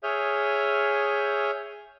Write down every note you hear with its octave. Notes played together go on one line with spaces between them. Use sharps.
G#4 C#5 E5 D#6 F6 G6